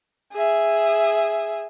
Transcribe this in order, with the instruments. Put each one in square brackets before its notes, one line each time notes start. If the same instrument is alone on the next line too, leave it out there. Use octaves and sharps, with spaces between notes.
[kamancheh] G#4 E5